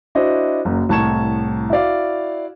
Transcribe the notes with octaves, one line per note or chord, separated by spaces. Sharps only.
D4 E4 F#4 C5 D#5
F#1 F#2
C2 A2 A5 C#6 G#6 E7
E4 F#4 D5 F5